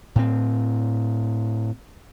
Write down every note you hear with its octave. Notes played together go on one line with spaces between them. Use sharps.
A2 C4